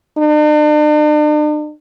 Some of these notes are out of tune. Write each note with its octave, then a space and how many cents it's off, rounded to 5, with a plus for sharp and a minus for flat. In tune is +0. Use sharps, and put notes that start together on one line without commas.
D4 +45